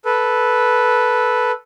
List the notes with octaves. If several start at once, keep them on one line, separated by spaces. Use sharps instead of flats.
A4 B4